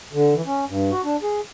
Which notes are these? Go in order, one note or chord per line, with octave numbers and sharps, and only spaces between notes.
D3
E3
C#4
G2
F#4
D4
G#4